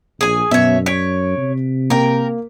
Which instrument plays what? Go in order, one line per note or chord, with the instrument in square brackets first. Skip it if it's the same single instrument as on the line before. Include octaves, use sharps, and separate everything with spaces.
[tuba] A#1 [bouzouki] G#4 G#5
[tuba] F#2 [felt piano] B2 [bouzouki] C#5 E5
[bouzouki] C#5 [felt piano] B6 D7
[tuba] C3
[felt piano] A#3 [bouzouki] A#4 G5